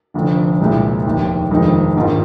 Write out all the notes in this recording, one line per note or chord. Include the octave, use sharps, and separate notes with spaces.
F1 F2 D3
C2 A#2 G#3
F1 D#2 D#3
F1 F2 D#3 G#3 D#4
G#1 G#2 D#3 A#3 F4